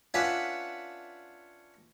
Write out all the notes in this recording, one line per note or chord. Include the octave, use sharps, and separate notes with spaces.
C#4 D4 F4 B4 E5 F#5